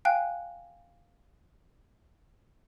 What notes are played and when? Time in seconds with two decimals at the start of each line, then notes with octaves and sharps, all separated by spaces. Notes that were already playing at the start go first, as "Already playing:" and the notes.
0.05 F5 G5 G#5 F#6